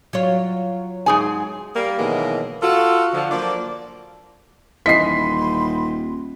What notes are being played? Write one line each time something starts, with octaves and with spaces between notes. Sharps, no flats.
F#3 F4 C#5
G#2 G#4 G#5
G3 A#3
B2 D#3 E3 F#3 G#3 A#3
F4 F#4 A4
D3 F3
F3 F#3 A#3 D4 D5
D#1 E3 D#5 B5 C6 B6 C7